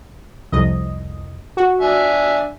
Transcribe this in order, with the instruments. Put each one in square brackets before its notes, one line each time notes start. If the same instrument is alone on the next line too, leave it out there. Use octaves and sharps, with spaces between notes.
[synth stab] C2 F2 D#5
F#4
[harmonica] D4 E5 G#5